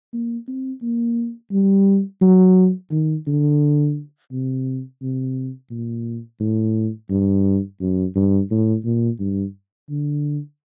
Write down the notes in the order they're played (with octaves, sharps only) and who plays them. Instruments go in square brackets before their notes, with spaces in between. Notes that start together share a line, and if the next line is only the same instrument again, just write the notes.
[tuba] A#3
C4
A#3
G3
F#3
D#3
D3
C3
C3
A#2
A2
G2
F#2
G2
A2
A#2
G2
D3